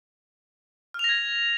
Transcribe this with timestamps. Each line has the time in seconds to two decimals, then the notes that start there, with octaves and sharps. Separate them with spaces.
0.94 F6
0.99 F7
1.04 A#6
1.09 G#6